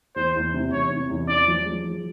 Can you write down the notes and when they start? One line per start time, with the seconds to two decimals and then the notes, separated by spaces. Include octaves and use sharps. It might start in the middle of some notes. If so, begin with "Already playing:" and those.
0.16 E2 C5
0.36 E2
0.54 C3
0.73 E2 C#5
0.91 C3
1.09 E2
1.28 C#4 D5
1.48 F3
1.66 G#3
1.85 F3